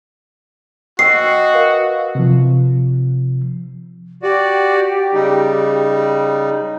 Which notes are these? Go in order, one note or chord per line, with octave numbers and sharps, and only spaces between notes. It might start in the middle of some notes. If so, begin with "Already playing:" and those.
F#4 D#5 G5 C#6 E6 C7
A#4 B4 F5
C3 F3
F#4 G4 D5
C#3 G3 D#4